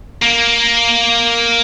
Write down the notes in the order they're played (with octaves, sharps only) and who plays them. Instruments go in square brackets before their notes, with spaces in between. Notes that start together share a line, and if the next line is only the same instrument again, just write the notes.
[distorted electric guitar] A#3